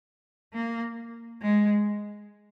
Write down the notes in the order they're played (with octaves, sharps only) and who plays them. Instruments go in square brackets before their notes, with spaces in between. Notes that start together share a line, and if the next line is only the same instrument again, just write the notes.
[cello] A#3
G#3